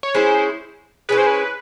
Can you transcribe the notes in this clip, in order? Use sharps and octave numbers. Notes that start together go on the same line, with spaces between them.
C#5
G#3 C#4 E4 C5
G#3 C#4 E4 B4
C5
B4